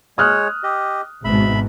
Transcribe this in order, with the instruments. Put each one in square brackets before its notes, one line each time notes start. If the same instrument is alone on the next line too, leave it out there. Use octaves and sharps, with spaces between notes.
[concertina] G#3 C#5 [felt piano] D#6 F6 F#6
[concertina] G4 D#5
[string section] G#1 G#2 B2 [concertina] E5 B5